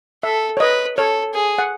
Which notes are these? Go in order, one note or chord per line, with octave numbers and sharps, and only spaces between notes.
A4 E5
C#5
B4 D#5
A4 C#5
G#4
F#5